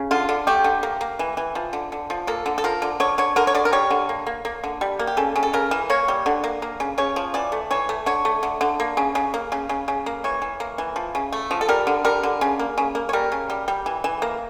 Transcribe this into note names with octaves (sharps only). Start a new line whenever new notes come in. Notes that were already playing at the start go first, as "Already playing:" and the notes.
Already playing: C#3
D3 F4
D3
A3 G4
D3
A#3
A#3
E3
E3
F3
D3
D3
F3
A#3 A4
D3
A4
F3 A#4
D3
D3 C#5
D3 C#5
D3 A#4
C#5
D3 D5
A#4
G3 C#5
D3
A#3
A#3
A#3
D3
G3
A#3
G4
C#3 A4
C#3
A4
C#3 A#4
E3
A#3 C#5
G3
D3
A#3
A#3
C#3
C#3 C#5
F3
E3 D5
A3
E3 C#5
A3
D3 C#5
A3
D3
D3
A#3
C#3
C#3
A#3
C#3
C#3
C#3
A#3
E3 C#5
E3
A#3
E3
F3
C#3
A3
F3
A4
G3 A#4
D3
G3 A#4
D3
C#3
A#3
C#3
A#3
C#5
G3 A#4
C#3
G3
G3
E3
E3
A#3